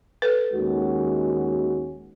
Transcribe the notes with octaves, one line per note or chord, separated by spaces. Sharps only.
A4 B4
D#2 D#3 G#3 C#4 F#4